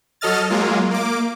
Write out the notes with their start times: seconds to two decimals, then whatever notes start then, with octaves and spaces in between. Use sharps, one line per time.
0.21 F#3 A4 D#5 F6 A6
0.50 F#3 G#3 A#3 F4
0.91 A#3 D6